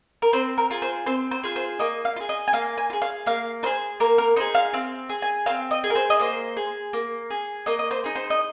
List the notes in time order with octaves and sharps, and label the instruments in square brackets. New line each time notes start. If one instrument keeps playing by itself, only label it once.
[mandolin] A#4
C4 C5
A#4
F4 G#4
C5
C4 C5
C5
F4 G#4
C5
A#3 D#5
F5
F4
G#4
D#5
G#5
A#3 F5
G#5
F4
G#4
F5
A#3 F5
D#4 G#4 C5
A#3 A#4
A#4
D#4 C5
G#4
F5
C4 F5
G#4
G#5
C4 F5
D#5
G#4
A#4
C5
D#5
A#3 C5
G#4
A#3
G#4
A#3 D#5
D#5
C5
D#4 G#4
C5
D#5